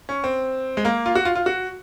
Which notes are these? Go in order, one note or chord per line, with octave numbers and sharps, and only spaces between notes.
C#4
C4
G#3
A#3
F4
F#4
F4
F4
F#4